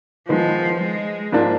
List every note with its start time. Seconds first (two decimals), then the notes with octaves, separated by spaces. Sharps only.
0.29 D#3 F3 G#3 B3
0.81 G#3
1.32 G#2 F3 A#3 D4